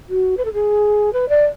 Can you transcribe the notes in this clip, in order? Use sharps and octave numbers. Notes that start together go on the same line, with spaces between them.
F#4
B4
A4
G#4
B4
D5